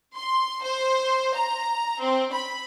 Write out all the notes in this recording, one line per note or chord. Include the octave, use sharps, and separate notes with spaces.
C6
C5
A#5
C4
B5